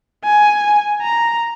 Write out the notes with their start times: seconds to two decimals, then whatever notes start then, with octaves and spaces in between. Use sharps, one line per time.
0.24 G#5
1.02 A#5